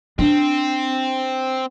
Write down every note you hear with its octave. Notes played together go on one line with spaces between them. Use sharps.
C4 D4